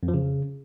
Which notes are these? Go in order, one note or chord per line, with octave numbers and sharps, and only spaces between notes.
F2
F3
C#3